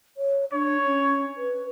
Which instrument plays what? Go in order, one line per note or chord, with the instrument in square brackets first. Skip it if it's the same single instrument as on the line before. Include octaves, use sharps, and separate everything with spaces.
[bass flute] C#5
[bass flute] D4 [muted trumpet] C#5
[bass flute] C#4
B4